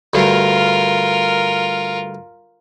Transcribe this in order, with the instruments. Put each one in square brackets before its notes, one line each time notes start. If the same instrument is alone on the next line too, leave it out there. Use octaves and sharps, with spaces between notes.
[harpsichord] D2 G2 [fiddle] F4 A#4